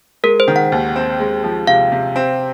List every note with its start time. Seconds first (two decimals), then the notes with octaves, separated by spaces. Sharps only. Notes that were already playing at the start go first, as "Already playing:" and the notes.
0.24 G#3 A#4
0.40 C5
0.48 D#3
0.56 F#5
0.72 D#2
0.96 C4
1.20 G#3
1.44 F3
1.67 C3 F5
1.92 C3
2.16 C4